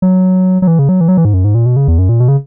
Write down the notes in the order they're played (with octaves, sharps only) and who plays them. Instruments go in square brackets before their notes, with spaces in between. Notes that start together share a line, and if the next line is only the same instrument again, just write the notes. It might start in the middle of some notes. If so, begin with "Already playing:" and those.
[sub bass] F#3
F#3
E3
C#3
F#3
E3
F#3
E3
G#2
F#2
G#2
A#2
B2
C#3
E2
F#2
A#2
B2
C#3